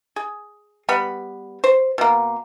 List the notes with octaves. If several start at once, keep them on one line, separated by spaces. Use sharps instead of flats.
G#4
G3 B3 B5
C5
B2 A#3